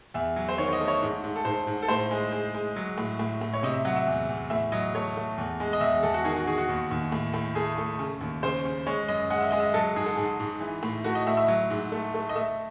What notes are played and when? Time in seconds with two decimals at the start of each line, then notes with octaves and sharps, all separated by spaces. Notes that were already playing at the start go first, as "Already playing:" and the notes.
0.14 E2 E5
0.36 F#3
0.49 C5
0.58 D#3 C#5
0.68 C#5
0.73 D#5
0.80 A3
0.88 C#5
1.02 G#2
1.24 G#2
1.36 A4
1.45 G#2 C5
1.67 G#2
1.82 A4
1.88 A2 C5
2.11 G#3
2.33 G#3
2.55 G#3
2.76 F#3
2.98 A2
3.19 A2
3.41 A2
3.54 C#5
3.63 C3 D#5
3.74 E5
3.85 F#3 F#5
3.96 E5
4.07 E2
4.29 E2
4.50 A2 E5
4.72 F#3 D#5
4.95 A3 C#5
5.17 A3
5.38 E2
5.60 G#3
5.73 D#5
5.81 E2 E5
6.03 E2 A4
6.14 F#4
6.24 D#3 G#4
6.36 F#4
6.47 D#3 G#4
6.58 F#4
6.69 D#2
6.91 D#2
7.12 A2
7.34 A2
7.55 A3 G#4
7.78 A3
7.99 C#3
8.21 D#2
8.43 C#3 C5
8.65 C#3
8.87 G#3 C#5
9.08 F#2 D#5
9.30 G#3 F#5
9.41 E5
9.50 G#3 D#5
9.60 E5
9.74 F#3 A4
9.96 G#2 G#4
10.06 A4
10.16 G#2 G#4
10.40 G#2
10.61 E3
10.83 A2
11.04 A3 F#4
11.15 D#5
11.27 A2 E5
11.37 E5
11.48 F#3
11.70 G#2
11.92 A3
12.14 A3
12.29 D#5
12.36 A3 E5